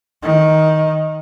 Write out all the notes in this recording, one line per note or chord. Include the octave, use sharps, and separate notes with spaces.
D#3